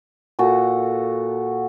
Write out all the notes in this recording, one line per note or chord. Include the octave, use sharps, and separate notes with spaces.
A#2 F#4 A4